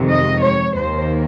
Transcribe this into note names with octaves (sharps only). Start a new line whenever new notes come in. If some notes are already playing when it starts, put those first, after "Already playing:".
Already playing: F2 C3 D#3 G#3
D#5
C#5
D#2 D#3 A#3 C5